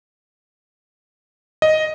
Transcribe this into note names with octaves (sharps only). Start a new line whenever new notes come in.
D#5